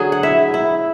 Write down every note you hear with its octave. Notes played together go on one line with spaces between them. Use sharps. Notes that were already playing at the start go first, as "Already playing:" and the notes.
Already playing: D3 F#3 G#4
F#5
E4 E5
E4